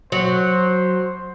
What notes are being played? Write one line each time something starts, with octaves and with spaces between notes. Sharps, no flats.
F#3 C5